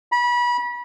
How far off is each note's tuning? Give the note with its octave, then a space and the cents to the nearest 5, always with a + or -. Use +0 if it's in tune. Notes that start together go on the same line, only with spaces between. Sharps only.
B5 -30